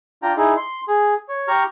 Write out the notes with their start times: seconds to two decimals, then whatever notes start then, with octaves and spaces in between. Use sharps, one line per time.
0.22 D4 F4 G5 A#5
0.37 D#4 E4 G#4
0.57 C6
0.88 G#4
1.29 C#5
1.48 G4 A#5 C#6 F6